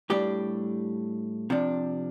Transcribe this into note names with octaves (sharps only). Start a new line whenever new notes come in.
A2 G3 D4 G4
C3 F3 D4